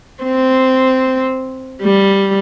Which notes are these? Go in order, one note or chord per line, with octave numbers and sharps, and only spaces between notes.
C4
G3